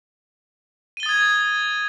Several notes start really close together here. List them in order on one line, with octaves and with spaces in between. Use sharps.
D#7 G7 A6 D#6 G#6